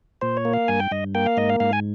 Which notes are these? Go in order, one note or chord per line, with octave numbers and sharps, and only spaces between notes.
A#2 C5
C#5
A#3
F5
G2 G#5
G5
G2 D#5
A#3 G5
F5
G#2 D#5
F5
G#2 F5
G#5